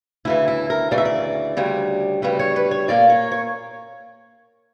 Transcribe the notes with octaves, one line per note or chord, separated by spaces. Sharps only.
D2 C#3 E3 E4
E4
A#4
D2 C#3 E3 D5
E5
D5
D2 C#3 G3
D2 C#3 G3 B4
C#5
B4
C#5
A#2 A#3 C#4 D5
C#5
C#5